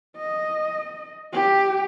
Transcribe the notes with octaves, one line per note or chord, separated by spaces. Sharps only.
D#5
G4